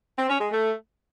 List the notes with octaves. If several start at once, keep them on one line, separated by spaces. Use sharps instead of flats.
C4
C#4
G#3
A3